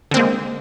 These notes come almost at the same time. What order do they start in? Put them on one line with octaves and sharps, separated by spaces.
D3 C4 A#3 G#3